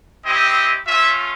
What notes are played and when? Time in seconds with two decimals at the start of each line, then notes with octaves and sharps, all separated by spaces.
0.25 C4 E4 G4 D#5
0.87 A3 C#4 F4 E5